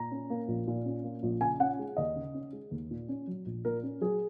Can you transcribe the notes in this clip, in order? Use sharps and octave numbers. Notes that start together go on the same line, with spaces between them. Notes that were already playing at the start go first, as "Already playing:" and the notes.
Already playing: A#2 A#5
C#4
A#3
A#1
A#2
C#4
A#3
A#1
C#3 G#5
C#4 F#5
G#3
D#2 D#5
C#3
C#4
G#3
D#2
A#2
C#4
F#3
A#1
A#2 A#4
C#4
F#3 G#4